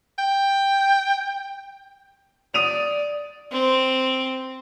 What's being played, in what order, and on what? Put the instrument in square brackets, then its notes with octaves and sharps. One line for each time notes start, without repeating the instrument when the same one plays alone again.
[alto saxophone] G5
[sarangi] D5 [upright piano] D#6 D#7 F7
[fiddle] C4